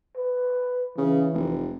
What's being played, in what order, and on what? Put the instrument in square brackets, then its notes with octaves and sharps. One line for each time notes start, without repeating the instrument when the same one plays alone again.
[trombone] B4
[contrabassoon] C#3 [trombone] E3
[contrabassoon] F1